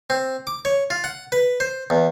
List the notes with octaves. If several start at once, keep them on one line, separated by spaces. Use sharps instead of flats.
C4
D6
C#5
F4
F#5
B4
C5
E2